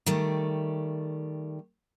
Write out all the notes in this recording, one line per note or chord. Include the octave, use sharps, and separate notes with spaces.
D#3 G3 A3